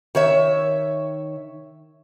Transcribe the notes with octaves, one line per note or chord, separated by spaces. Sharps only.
D#3 C#5 E5